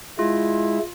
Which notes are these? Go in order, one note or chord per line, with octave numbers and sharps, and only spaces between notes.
G#3 E4 F4